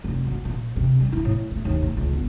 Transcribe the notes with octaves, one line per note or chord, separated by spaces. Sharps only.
F1
D2
A#2
C3
G3
E4
A2
A3
D#2
A2
C#2
G1